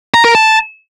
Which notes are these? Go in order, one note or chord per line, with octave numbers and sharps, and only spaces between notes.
A#5
A#4
A5